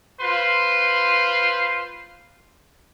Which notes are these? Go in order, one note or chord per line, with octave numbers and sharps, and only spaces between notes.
F4 B4 C5 C6